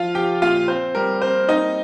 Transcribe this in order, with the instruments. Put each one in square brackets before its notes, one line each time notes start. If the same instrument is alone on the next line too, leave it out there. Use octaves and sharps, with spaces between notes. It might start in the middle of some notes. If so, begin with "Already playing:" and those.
Already playing: [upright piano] F3 F4 F5
F3 G4 G5
A#2 F4 F5
C4 C5
G3 A#4
C4 C5
A#3 D#4 D#5